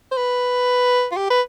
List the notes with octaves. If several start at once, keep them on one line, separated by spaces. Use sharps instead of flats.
C5
B4
F4
G4
B4